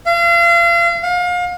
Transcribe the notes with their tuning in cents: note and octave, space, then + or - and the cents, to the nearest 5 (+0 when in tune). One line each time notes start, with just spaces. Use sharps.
F5 -35
F5 +35